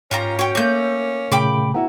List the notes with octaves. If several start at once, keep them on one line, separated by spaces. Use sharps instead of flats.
G#2 C#4 F4 G4 A#5
F#4 C#5 G5
A3 A#3 C#5 D6 G6 A#6
A#2 C#3 A3 G5 B5 D6
B3 E4 F#4 F#5 A#5